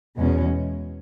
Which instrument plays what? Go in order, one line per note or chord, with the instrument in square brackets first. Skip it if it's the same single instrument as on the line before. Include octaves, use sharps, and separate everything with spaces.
[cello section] E2 B2 G#3 C#4